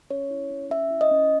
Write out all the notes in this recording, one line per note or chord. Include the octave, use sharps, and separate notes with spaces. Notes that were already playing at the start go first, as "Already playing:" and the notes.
C#4 C#5
E4
C#4
C#4 E5
E4
D#5
C#4